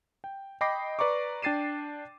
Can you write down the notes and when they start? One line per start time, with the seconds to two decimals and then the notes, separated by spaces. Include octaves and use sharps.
0.24 G5
0.61 D#5 G5 B5 D6 A#6 C7
0.99 B4 D5 A#5 C#6 D6
1.42 D4 G5 A6 C7 D#7 E7